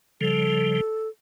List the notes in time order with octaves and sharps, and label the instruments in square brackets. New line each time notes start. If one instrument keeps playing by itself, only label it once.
[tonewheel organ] C#3 F3 G3 [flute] A4